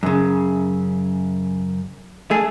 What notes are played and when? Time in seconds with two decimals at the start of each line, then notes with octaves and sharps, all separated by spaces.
0.03 F#2 C#3
2.31 A3 G#4